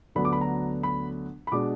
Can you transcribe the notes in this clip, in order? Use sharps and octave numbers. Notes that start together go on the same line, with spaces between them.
D2 D3 F#3 B3 D4 B5
D6
B5
A#5
B5
B5
B2 G#3 D4 D6